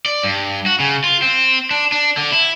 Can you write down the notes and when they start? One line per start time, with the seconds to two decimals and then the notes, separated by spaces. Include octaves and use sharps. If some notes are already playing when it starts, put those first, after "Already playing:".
0.06 D5
0.24 G2
0.66 F#4
0.80 C#3
1.04 F4
1.22 C4
1.71 D4
1.92 D4
2.17 D3
2.32 E4